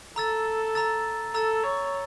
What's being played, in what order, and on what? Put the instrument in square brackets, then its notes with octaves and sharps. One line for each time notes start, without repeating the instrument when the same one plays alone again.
[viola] A4 [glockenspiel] A#5 E6 A6
[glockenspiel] A#5 E6 A6
[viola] A4 [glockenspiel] A#5 E6 A6
[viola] C#5